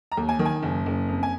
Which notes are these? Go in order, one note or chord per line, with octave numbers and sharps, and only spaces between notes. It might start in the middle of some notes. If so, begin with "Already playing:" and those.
A#5
D#2
G#5
D#3
G#5
F#1
F#1
F2
G#5